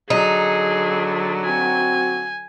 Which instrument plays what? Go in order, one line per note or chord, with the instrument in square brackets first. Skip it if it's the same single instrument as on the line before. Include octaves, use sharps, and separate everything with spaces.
[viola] D3 F#3 [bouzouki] D#4 [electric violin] G#4
[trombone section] C4 F#4 [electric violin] G#5